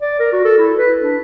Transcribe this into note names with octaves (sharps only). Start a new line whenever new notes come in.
D5
A#4
F#4
A4
E4
B4
D4